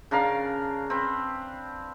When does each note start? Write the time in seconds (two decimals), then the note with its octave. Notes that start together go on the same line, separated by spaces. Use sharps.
0.11 C#3 D4 A#4 F5
0.90 C4 B4